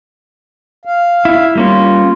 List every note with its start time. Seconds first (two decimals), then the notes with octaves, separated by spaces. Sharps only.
0.85 F5
1.25 E4
1.55 G3 A#3 C#4 F4